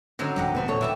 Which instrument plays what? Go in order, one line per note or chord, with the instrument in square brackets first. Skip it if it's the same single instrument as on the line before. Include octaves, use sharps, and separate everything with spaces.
[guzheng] D3 F#3 D#4 [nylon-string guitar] C4 C#4
[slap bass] D1 D#2 F#3 [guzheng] G4 D#5 F#5
[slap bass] E1 F#3 [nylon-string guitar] B3 C4 D4
[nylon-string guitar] A#2 A4 C#5
[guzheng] E3 E4 G4